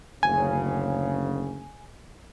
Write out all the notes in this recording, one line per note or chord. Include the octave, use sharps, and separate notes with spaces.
F#1 D2 C#3 G#5